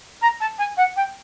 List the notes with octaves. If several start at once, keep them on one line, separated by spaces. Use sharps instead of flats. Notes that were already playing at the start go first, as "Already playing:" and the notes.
A#5
A5
G#5
F#5
G5